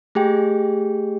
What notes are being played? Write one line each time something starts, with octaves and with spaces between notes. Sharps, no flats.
A3 G4 G#4 G5